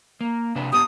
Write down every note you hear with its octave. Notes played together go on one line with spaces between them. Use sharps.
A#3
C3 D4 B4
B3 G4 D#6